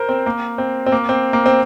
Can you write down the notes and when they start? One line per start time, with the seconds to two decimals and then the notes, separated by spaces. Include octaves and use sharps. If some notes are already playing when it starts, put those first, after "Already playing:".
Already playing: A#4 C5
0.09 C4
0.26 A#3
0.58 C4
0.86 C4
0.92 A#3
1.09 C4
1.33 A#3
1.46 C4